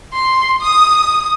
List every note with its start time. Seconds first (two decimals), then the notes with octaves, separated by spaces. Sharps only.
0.13 C6
0.61 D#6